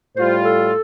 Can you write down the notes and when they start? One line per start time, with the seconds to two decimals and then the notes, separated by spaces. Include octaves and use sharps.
0.16 A2 G3 F4 C5
0.45 A4